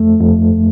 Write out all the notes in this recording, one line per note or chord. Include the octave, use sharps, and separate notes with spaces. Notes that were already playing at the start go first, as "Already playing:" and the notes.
Already playing: F2 A3
F2